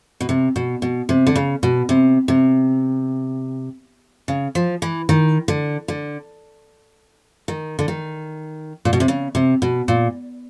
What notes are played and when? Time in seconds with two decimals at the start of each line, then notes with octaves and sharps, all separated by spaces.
0.21 B2
0.29 C3
0.56 B2
0.82 B2
1.09 C3
1.27 D3
1.36 C#3
1.63 B2
1.89 C3
2.28 C3
4.28 C#3
4.55 F3
4.82 E3
5.09 D#3
5.48 D3
5.88 D3
7.48 D#3
7.79 D3
7.88 D#3
8.85 A#2
8.93 B2
9.00 C3
9.08 C#3
9.35 C3
9.62 B2
9.88 A#2